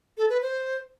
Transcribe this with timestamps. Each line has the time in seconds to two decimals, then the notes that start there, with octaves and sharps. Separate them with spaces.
0.18 A4
0.30 B4
0.42 C5